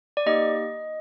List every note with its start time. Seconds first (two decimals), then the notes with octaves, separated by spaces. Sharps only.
0.17 D5
0.26 A#3 D#4 G4 D#5